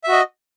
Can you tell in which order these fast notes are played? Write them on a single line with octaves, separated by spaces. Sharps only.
E5 F#4 D#5